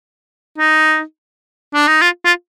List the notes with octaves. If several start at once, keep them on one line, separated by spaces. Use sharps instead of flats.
D#4
D4
D#4
F4
F4